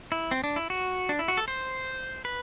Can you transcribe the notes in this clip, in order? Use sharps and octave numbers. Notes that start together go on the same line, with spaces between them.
E4
C4
D4
E4
F#4
D4
E4
F#4
A4
C5
B4